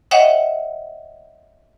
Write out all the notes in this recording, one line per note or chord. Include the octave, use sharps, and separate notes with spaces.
C#5 D#5 E5 F#5 G5